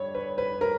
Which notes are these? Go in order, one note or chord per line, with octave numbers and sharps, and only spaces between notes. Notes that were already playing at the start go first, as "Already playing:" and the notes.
Already playing: G2 C#5
B4
B4
A#4